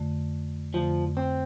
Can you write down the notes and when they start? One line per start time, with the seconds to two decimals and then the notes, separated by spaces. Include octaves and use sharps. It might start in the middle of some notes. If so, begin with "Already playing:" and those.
Already playing: F2 D3 A3
0.73 F2 D3 F3 A3
1.17 C4